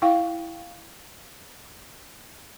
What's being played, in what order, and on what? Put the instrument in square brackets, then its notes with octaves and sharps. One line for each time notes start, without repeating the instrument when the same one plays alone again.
[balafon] E4 F5 G5 C#6